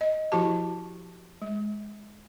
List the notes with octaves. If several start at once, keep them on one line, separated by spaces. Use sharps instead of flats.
D#5
F3 E4 F#4 G4 A5
G#3